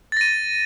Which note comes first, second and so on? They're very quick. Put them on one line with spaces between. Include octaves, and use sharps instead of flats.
A6 A#6 D#7